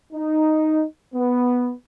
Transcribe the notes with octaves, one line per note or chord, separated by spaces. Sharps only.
D#4
B3